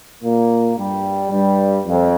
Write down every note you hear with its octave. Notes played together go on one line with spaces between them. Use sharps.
A#2 A#3
G2 G3
G2 G3
F2